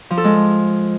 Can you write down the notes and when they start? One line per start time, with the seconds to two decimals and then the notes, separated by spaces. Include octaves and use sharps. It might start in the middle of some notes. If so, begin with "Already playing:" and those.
0.11 F3
0.17 A4
0.24 G#3